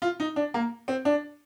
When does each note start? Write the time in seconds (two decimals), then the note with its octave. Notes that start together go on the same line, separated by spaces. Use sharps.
0.02 F4
0.20 D#4
0.36 D4
0.54 A#3
0.88 C4
1.05 D4